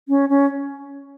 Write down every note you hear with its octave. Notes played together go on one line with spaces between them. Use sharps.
C#4
C#4